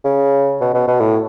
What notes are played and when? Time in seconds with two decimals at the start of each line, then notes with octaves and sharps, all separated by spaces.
0.04 C#3
0.61 B2
0.74 B2
0.87 B2
1.00 A2